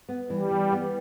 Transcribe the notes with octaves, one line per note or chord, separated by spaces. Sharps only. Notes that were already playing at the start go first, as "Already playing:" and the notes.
B3
E3 G3
E3
B3